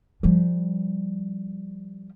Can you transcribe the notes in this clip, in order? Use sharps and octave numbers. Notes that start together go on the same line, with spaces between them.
F3 G3